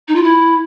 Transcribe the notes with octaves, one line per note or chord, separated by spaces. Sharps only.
D#4
F4
E4